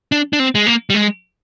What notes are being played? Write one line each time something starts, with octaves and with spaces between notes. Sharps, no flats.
D4
D4
C4
G#3
A#3
G3
G#3